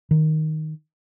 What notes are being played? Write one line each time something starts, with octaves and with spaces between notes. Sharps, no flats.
D#3